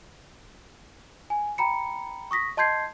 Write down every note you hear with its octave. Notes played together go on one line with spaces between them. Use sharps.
G#5
G5 A#5 B5 C#7
C#6 D#6 A#6 B6
D#5 A5 C6 G6 G#6 C7